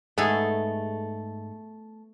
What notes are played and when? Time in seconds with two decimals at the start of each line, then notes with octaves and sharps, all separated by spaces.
0.18 G#2 A3 B3 G#4 A4